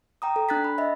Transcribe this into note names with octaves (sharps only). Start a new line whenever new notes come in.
G5 A#5 D#6
A4
D4 F#6 A6 B6
B5
D#5 E5